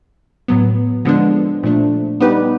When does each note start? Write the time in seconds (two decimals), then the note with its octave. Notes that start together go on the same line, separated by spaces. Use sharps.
0.48 A2 F#3 B3
1.05 D3 F3 G#3 B3 D4
1.63 A#2 F3 A3 D4
2.20 G3 B3 D#4 G4 B4